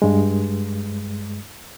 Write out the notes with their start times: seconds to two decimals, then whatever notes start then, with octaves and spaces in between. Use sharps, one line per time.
0.02 G2 G#3